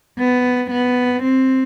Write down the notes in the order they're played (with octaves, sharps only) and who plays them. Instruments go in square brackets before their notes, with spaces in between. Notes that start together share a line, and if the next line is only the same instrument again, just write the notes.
[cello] B3
B3
C4